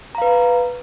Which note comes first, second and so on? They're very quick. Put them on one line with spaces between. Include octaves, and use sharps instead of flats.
A#5 F5 B4